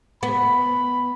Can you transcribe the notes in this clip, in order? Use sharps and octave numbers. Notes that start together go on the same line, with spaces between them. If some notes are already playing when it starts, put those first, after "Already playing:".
B3 B5